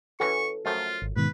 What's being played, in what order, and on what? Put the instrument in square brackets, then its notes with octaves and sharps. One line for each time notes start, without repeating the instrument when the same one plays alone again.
[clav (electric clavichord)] E3 C#4 F#4 [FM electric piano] A4 [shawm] C#6
[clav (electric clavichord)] F#2 F3 A3 [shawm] F4
[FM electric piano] G#1
[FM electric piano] G#2 B2 D#3 [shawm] B4